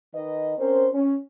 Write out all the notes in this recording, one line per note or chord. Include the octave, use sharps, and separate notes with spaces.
D#3 B4 D#5
C4 C#4 A#4 C5
C#4